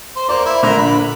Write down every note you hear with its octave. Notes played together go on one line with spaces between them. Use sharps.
C5
A#3 C5 D5
E4
A#1 D3 A#4 C5
B5